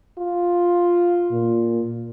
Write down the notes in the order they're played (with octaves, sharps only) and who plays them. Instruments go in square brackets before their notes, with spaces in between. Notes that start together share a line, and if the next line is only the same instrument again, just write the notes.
[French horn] F4
[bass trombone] A#2